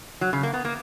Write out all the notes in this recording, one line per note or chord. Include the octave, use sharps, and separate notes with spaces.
F#3
C#3
A#3
B3
A#3